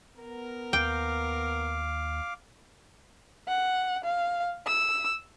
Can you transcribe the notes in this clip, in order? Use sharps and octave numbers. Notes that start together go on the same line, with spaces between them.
B3 A#4
D#2 F5 G5 D6
F#5
F5
E6